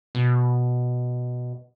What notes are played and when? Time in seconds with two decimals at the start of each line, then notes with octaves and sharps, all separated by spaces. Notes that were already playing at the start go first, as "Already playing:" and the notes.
0.15 B2